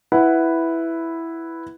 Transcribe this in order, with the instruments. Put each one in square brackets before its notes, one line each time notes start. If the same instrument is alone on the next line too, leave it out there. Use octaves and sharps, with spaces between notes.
[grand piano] E4 B4 F#5